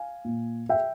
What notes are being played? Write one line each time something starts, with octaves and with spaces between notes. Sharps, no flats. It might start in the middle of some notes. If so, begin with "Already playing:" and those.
Already playing: F5 G#5
A#2
E5 G5